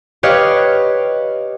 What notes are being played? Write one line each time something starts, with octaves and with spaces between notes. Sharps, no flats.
G4 B4 C#5 D#5 F5